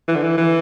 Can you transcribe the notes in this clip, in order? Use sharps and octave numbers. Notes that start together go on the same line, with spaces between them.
E3
D3
E3
E3